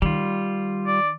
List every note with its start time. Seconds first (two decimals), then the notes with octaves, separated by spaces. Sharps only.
0.02 D#3 G3 F4
0.86 D5